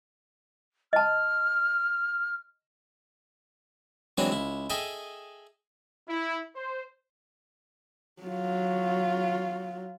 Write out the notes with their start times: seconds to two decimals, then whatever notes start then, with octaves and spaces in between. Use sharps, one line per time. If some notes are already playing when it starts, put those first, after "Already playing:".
0.93 D#5 A5 F6
4.18 E3 F#3 G#3 C4 D4 E4
4.31 C#2 E4
4.70 G#4 A4 D#5 E5 G5
6.09 E4
6.55 C5
8.22 F#3 F4